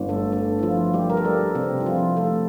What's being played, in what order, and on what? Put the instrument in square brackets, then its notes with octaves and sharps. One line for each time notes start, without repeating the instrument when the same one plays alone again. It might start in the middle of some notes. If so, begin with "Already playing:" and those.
Already playing: [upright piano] G1
[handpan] A3 A4
A3 A4
E4
F3 F4
G3 G4
A#4
A4
G3 G4
C3 C4
E4
F3 F4
A3 A4